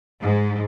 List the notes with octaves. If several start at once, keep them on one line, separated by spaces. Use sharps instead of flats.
G#2